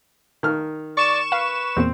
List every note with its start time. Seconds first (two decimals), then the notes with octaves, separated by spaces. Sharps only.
0.43 D#3 F6
0.97 D5 C#6 E7
1.32 B4 F5
1.77 E2 A#2 C4